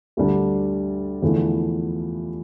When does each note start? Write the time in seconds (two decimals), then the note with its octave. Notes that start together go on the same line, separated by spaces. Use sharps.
0.17 D2 D3 G3 D4
1.22 E2 D3 F3 A3 E4